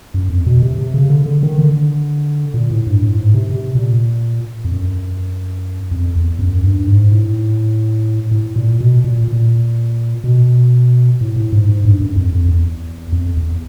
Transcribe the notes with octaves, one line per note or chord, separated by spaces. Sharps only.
F#2
F2
B2
C3
C3
C#3
D3
D3
D#3
D3
A#2
A2
G2
A2
G#2
C3
C3
A#2
F2
F#2
F2
E2
F#2
G2
G#2
A2
A2
A#2
B2
A#2
A#2
B2
A2
A2
G#2
G#2
G2
F#2
F2
F2
E2
F2
E2